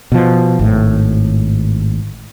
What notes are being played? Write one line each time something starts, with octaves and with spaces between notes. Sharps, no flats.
B2 F3
G#1 A2